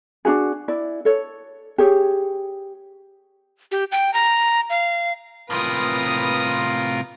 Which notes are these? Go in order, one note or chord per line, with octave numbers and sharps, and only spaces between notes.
D4 D#4 F#4 G#4
E4 D5
A4 C#5
G4 G#4 C#5
G4
G5
A#5
F5
A2 C3 F4 A#4 B4 D#6